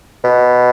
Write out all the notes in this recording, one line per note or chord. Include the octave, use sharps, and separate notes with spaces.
B2